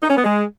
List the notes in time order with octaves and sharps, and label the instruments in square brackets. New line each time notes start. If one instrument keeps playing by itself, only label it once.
[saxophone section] D#4
C#4
B3
G#3